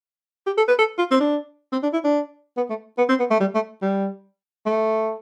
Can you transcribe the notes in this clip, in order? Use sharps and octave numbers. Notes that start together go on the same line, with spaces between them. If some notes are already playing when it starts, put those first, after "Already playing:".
G4
A4
B4
A4
F4
C4
D4
C4
D4
E4
D4
B3
A3
B3
C4
B3
A3
G3
A3
G3
A3